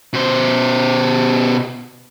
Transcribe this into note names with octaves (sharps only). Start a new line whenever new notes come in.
B2 C5